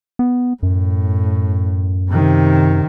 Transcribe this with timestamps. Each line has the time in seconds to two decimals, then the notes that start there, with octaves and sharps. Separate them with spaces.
0.19 B3
0.63 F#2 A2
2.11 C3 D#3